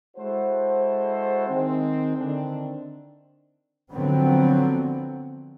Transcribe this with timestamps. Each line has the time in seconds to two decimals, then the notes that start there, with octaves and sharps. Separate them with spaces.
0.17 G#3 E4 F#4 A4 C5
1.48 D#3 G#3 C4
2.16 D3 D#3 C4 D4
3.92 D3 F3 F#3 B3 C4